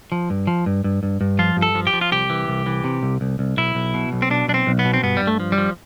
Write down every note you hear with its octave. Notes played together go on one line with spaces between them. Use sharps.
F3
G2
F3
G2
G2
G2
G2
F3 F4
G2
A4
F3
G4
F3
F4
C2 G4
E3
C2
E3
C3
C2
C2
C2
B1 E4
B1
B2
B1
C4
B2 D4
B1 D4
C4
B1
B3
B2
C4
G2 B3
G2 G3
A3
F3
G3
F3